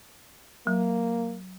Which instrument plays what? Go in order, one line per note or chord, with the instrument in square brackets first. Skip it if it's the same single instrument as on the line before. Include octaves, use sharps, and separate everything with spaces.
[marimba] F#3 [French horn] A#3